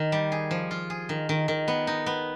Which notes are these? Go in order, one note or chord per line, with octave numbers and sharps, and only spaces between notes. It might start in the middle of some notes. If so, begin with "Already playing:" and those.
Already playing: D#3
G3
G#4
F3
F4
G#4
D#3
D#3
D#3
B3
D#4
B3